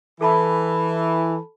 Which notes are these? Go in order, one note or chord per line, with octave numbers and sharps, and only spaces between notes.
E3 A4 A5 B5